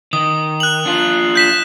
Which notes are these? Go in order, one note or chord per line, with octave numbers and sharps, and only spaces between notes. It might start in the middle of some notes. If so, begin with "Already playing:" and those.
D#3 D#6
F#6 F#7
D4 F4
G6 B6 E7